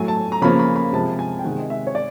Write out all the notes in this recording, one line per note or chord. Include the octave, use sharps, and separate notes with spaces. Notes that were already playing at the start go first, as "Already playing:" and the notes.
Already playing: A2 F#3 A3 G#5
A5
A#5
C#3 F3 A#3 C#4 B5
B5
B5
C3 F3 G#3 A5
G#5
G5
C3 D#3 G#3 F#5
D#5
E5
C#5
D5